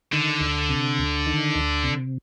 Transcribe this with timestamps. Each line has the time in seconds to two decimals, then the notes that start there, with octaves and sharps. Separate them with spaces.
0.12 D3 D#3
0.40 D2
0.69 C3
0.99 D2
1.27 D#3
1.55 D2
1.83 C3